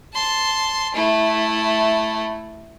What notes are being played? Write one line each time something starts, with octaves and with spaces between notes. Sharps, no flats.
A5 C6
A3 E4